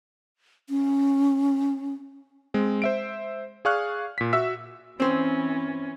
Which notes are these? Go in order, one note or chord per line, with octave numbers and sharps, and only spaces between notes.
C#4
G#3 C4
C5 E5 D7
G#4 D5 F5 C#6 F6 F#6
A#2 B6
F#4 E5 E6 B6
E3 C4 C#4 C5